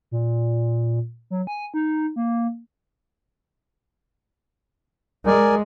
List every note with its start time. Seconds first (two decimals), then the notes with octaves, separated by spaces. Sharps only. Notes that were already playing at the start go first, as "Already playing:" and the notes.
0.11 A#2
1.30 F#3
1.47 G#5
1.74 D#4
2.16 A#3
5.26 G#3 A#4 D5 G#5